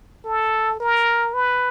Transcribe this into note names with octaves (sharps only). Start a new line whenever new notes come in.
A4
A#4
B4